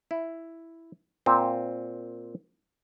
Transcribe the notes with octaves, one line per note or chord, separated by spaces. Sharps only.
E4
A#2 C4